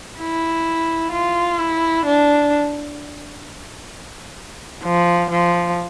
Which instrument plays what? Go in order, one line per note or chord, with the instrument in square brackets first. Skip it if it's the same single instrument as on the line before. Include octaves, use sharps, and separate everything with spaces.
[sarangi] E4
F4
E4
D4
F3
F3